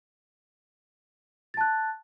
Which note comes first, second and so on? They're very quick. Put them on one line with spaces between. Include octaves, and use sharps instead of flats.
A6 A5 F#6